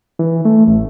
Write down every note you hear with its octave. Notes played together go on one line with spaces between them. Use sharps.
E3
A3
A1